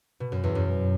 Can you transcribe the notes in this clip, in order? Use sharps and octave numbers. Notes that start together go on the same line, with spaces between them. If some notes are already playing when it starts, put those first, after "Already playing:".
B2
F#2
E2
F#2